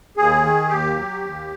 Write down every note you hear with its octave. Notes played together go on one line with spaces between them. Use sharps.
D#2 G#4
D#3
D#2 G4
F#3
D#2